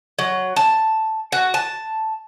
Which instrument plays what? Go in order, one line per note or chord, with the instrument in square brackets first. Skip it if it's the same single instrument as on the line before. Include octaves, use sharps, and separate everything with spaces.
[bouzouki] F#3
A5
F#4
A5